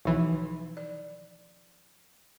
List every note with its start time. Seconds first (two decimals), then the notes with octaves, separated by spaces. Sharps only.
0.05 B1 E3 F3 D#4
0.33 D#3
0.77 D5